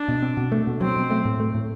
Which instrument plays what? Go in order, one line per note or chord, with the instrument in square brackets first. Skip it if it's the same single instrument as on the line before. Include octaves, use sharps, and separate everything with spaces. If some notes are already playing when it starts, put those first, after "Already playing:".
Already playing: [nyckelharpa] D4
[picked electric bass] B2
C4
B2
A3
B2
[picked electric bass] F#3 [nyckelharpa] C4
[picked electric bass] B2
A3
A2
A3
A2